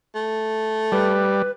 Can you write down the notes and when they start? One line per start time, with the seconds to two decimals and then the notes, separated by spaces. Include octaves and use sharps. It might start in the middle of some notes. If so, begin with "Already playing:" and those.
0.15 A3
0.92 G3 B4